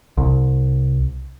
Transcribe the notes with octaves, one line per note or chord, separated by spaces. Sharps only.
C2